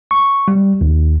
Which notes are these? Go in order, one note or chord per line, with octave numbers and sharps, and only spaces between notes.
C#6
G3
D#2